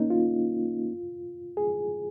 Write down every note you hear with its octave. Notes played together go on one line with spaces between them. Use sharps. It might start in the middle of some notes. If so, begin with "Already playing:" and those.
Already playing: A#3 C#4 D#4
F4
G#4